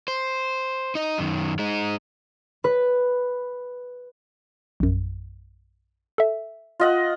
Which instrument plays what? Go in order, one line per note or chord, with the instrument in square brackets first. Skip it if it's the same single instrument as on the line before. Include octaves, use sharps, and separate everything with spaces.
[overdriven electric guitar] C5
D#4 D#5
F#2 D#3
G#3 D#4
[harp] B4
[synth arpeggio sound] A#1 F#2
A4 E5
[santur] F4 D#5 F#5